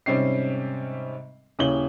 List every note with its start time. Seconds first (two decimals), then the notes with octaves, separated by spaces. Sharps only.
0.06 G#2 C3 G3 C4 C#4 C7
1.59 D#1 C#3 E4 C#5 F#7 G7